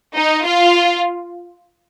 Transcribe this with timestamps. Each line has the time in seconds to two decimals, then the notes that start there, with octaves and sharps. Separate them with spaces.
0.16 D#4
0.44 F4